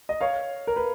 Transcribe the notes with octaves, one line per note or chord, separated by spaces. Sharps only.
D#5
C#5 F5
A#4
B4